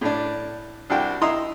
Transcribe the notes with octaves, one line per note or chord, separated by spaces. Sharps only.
A2 D4
C2 D4 F#4 G5
E4 D#5 A#5 C6 D#6